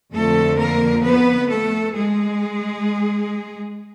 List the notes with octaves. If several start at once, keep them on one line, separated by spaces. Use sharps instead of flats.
F2 D3 F3 A3 A4
A#3 A#4
B3 B4
A3 A4
G#3 G#4